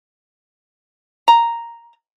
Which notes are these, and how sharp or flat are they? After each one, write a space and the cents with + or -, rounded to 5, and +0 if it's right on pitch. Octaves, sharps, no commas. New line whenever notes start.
A#5 +0